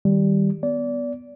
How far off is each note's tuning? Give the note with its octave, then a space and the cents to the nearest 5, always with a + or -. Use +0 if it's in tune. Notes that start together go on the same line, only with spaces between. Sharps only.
D#3 +0 G3 +0
B3 +0 D5 -25